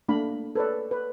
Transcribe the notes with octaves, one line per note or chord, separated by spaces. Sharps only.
A3 A#3 D4 F5 B5
A4 B4 C#5 D5
B4